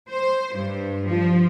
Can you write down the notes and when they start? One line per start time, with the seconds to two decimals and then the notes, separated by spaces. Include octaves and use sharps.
0.11 C5
0.55 G2
1.09 F3